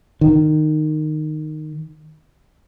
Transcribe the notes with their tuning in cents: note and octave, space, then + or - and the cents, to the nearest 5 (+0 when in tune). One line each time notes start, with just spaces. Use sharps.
D#3 -15